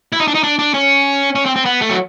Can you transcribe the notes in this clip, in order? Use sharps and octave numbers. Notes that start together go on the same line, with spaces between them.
E4
D#4
D4
D#4
D4
D4
C#4
C#4
C4
C4
B3
A3
F#3